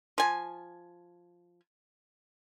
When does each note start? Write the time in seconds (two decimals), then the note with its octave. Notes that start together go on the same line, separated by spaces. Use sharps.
0.18 F3 G#5